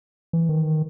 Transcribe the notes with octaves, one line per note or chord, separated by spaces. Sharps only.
E3
D#3